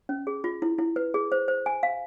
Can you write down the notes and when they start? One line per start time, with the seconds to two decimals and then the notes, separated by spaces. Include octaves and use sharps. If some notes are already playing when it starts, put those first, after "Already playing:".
0.09 C#4
0.27 G#4
0.44 F4
0.62 E4
0.78 E4
0.96 B4
1.14 G#4
1.32 C5
1.48 C5
1.66 G#5
1.83 F5